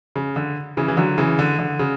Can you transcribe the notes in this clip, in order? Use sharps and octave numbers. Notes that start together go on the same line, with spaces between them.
C#3
D3
C#3 E3
E3
D3 F#3
C#3 E3
D3
D3
C#3